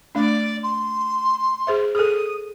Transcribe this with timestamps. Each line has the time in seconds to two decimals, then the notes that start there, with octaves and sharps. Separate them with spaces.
0.15 A3 D4 D5
0.62 C6
1.67 G#4 C5 E5
1.95 G#4 A4 D#6